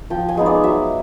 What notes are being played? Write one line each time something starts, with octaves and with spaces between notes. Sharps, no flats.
F3 G5
G#5
G#3 B3 D#4
D5
F#3 E5